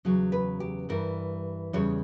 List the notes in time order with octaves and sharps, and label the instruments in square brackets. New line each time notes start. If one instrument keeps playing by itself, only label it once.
[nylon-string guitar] E2 C#3 F#3
B4
G4
G2 E3 G3 A#4
E2 C#3 G3 C#5